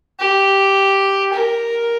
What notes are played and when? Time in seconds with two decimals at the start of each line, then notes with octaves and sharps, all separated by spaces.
0.19 G4
1.33 A#4